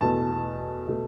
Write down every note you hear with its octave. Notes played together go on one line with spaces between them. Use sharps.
E2 B2 A3 A5
B2 A3